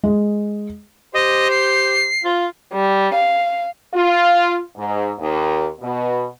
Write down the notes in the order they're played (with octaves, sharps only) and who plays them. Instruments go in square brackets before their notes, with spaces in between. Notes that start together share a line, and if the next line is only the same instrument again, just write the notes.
[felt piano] G#3
[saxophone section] G4 C5 [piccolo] D#5
[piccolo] C7
[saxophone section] F4
[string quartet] G3
F5
[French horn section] F4
G#2
D#2
B2